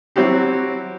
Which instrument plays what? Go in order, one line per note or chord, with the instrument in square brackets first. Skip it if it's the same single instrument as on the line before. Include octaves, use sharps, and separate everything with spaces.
[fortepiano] F#3 C4 E4 F#4 G4